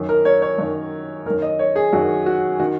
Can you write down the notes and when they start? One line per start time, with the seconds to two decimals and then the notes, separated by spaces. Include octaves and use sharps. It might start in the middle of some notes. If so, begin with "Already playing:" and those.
Already playing: F#2 D#3
0.09 A#4
0.25 C#5
0.42 C#5
0.58 F#2 D#3
1.26 D#3 A#4
1.30 F#2
1.42 D#5
1.59 C#5
1.76 G#4
1.93 F#2 D#3 F#4
2.26 F#4
2.60 D#3 F#4